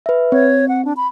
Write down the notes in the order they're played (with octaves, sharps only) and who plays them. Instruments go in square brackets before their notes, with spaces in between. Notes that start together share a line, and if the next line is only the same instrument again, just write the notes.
[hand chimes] B4 E5
[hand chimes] C4 [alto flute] C#5
[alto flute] F#5
D4
B5